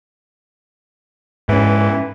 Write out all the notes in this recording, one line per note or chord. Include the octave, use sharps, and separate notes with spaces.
G#2 E3 C#4